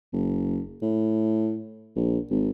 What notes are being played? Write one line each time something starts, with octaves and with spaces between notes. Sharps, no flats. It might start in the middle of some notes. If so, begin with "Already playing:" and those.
F#1
A2
A#1
G#1